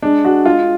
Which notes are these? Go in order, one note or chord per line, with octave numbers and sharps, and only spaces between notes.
G#3 D4
G#3 F#4
G#3 F4